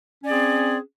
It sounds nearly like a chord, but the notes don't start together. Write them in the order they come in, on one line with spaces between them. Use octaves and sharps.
C#4 D5 G#4 C4